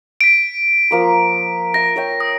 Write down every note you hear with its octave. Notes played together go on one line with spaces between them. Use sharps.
B6 D7
F3 A#3 C6
E5 A#6
C#5 E5 G5
D#6